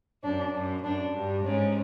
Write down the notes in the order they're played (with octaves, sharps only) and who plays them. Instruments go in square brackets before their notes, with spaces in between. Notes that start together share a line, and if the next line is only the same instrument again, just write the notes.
[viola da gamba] F#2 [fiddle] D4
[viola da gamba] F#2
[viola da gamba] F#2 [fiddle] D4
[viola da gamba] G2
[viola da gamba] G#2 [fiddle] C#4